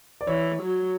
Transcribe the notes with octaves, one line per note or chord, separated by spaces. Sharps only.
D5
E3 C#5
F#3